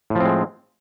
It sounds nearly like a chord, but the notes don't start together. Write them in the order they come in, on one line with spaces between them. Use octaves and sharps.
A2 F3 C4 G#3